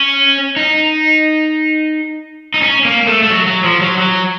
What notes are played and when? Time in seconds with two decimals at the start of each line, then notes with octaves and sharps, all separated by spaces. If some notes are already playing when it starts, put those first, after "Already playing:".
Already playing: C#4
0.56 D#4
2.54 D#4
2.62 C#4
2.85 A#3
3.07 A3
3.23 A3
3.30 F#3
3.47 F#3
3.64 F3
3.82 F#3
3.98 F#3